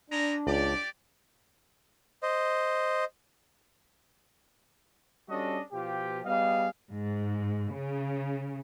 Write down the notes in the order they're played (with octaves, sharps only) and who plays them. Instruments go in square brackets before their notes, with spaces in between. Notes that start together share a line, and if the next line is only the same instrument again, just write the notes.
[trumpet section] G3 G#3 A#5 [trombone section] D4
[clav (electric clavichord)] C#2 [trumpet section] G4 D5
[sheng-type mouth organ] C5 D#5
[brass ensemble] G3 C#4 D4 F#4 A4 D#5
B2 F3 F4 G4
G3 B3 G#4 D#5 F5
[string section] G#2
C#3